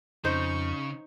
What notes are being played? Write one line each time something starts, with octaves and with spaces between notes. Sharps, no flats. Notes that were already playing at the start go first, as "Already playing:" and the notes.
F2 C#3 D#4 C5 C#6